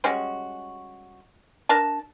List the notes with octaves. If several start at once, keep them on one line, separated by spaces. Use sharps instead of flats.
G3 G#3 C#4 F#4
D4 A#4 A5